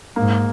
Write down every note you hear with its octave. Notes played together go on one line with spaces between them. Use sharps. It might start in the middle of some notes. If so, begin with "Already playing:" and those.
G#2 A#3